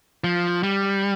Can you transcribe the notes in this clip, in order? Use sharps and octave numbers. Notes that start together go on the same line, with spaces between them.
F3
G3